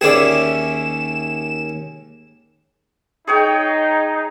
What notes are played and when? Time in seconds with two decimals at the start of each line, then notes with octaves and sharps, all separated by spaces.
0.01 D#2 C#4 G#4 D5 E5 E7
3.27 D#4 G#4 C#5 G5